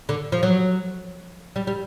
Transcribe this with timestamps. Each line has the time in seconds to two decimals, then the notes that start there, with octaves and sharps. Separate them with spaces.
0.09 D3
0.32 F3
0.43 F#3
1.56 G3
1.67 G3